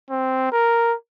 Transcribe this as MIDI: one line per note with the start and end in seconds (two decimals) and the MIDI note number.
0.11 0.51 60
0.52 0.94 70